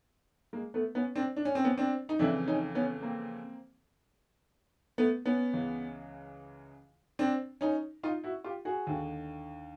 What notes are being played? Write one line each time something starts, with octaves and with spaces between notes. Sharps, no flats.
G#3 A#3
A3 B3
B3 C#4
C4 D4
D4
C#4
C4
B3 C#4
C4 D4
D#4
F2 C#3 E3 D4 E4
C#4 D#4
B3 C#4
A#3 C4
A3 B3
B3 C#4
C#2 C#3 E3
C4 D4
C#4 D#4
D#4 F4
E4 F#4
F4 G4
F#4 G#4
D#2 D3